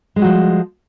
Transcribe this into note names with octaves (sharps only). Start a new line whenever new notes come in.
F3 G3 G#3 F#4